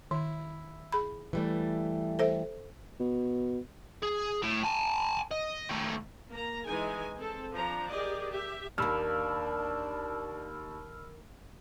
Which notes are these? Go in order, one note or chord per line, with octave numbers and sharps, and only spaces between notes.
D#3 E4
G#4 B5
E3 G3 A3
A4 C5 E5
B2
G#4
A2
G#5 A5
D#5
D#3 A3
A#3 A#5
E3 G#3 D#4 G#5
C4 A4
F3 D4 A#5
G4 G#4 A#4 D5 D#5
G4 E5
D#2 D#3 A#3 D4 B5 E6 F6